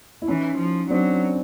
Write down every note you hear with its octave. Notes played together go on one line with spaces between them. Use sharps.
E4
E3 C#4 D#4
F3
F#3 C4 D4